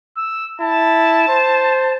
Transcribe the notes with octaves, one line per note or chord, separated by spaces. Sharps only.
E6
E4 A5
C5